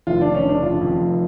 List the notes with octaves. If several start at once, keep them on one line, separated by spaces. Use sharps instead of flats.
F1 F4
F1 D4
C#4
C#3
D4
F1 F4
F2
F1